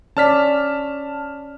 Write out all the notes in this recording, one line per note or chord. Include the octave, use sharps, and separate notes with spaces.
C#4 C#5 D5 A5 F6 B6